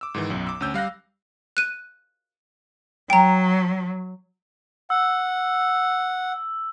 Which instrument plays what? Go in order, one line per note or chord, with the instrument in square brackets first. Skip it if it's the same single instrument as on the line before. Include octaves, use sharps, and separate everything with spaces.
[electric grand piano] D6 E6
G#2 D#3 E3
B1 F#2
D6 E6
D2 C#4 E6 G6
G3 F5 F#6 A#6
[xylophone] F#6 D#7
[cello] F#3 [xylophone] G5 A#5
[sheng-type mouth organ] F#5 [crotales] E6